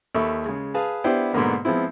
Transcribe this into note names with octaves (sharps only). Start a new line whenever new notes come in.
D#2 A4 E5 B5 C#6
C#3 G#3
G#4 B4 F5 A5
B3 D4 E4 G4 C5
G#2 B2 D3 A#3 B3
F3 G#3 B3 C4 E4